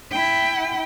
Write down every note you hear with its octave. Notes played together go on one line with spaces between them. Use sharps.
E4 G5